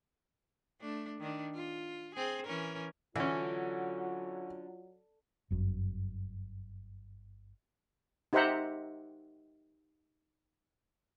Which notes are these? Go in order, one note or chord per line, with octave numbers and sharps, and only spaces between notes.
A3 D4
D#3 D4
F4
C4 G#4
E3 C#4 A#4
D3 E3 F#3 C#4 F4
G1 F#2
D#4 G4 C5 E5 F#5 A#5